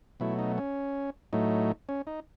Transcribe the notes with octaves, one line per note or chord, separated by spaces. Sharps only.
B2 F#3 A3 E4
D#4
C#4
A2 F#3 A3 D#4
C#4
D#4